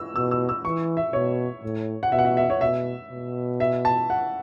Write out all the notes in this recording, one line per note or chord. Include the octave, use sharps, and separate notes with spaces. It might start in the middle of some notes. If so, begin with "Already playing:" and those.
Already playing: E6
B2 E6
E6
E6
E3 C#6
E5
B2 C#5
A2
F#5
B2 E5
F#5
E5
E5
C#5
B2 E5
B2
E5
A5
F#5